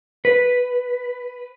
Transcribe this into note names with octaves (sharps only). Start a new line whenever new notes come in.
B4